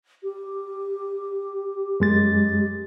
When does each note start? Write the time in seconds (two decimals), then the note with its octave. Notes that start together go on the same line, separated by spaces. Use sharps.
0.23 G4
2.00 F#2 G#3 A6